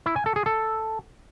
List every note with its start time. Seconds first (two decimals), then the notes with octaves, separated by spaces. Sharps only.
0.06 E4
0.16 G#5
0.26 A4
0.36 G#4
0.46 A4